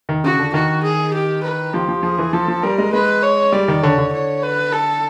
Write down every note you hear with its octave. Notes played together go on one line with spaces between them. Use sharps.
D#3
C#3 F#4
D3
D#3 F#4
G#4
G4
B4
F3 G4
F3
F3 G#4
E3
F3 A4
F3
G3 A#4
G#3
G#3 B4
C#5
G3 D5
D#3
D3 C#5
D3
C#5
B4
A4